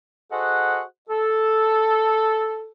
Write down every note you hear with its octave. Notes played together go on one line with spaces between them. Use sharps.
F#4 G#4 A4 C5 D#5 F#5
A4